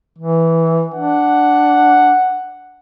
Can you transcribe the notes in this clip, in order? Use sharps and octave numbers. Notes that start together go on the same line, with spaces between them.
E3
D4 F#5